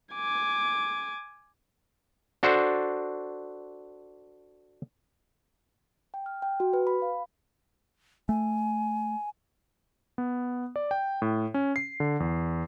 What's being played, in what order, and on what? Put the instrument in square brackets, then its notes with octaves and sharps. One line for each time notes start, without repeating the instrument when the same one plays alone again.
[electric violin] G#5 D6
[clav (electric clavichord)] D4 F#4 A4 C5
[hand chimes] G5
F6
G5
F#4
B4
B5
F5
[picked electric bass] A3 [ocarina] G#5
[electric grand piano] B3
D5
G5
A2
C#4
C7
D3
E2